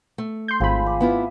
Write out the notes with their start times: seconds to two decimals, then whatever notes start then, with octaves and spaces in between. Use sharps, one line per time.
0.18 A3
0.48 C6 G6
0.60 G#1 F3 C4 G#4 B5
0.86 D6
1.01 B3 E4 F4 E5